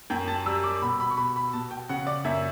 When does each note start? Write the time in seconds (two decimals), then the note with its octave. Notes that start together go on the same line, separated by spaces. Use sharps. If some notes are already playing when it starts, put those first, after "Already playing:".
0.10 F#2 G5
0.28 A5
0.46 G3 E6
0.63 D6
0.82 B2 B5
1.00 B5
1.10 C#6
1.17 B2 B5
1.36 B5
1.53 B2 A5
1.71 G5
1.89 C#3 F#5
2.07 D5
2.25 F#2 E5